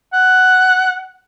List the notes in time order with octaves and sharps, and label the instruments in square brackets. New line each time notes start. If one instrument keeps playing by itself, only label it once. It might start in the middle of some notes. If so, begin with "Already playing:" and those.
[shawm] F#5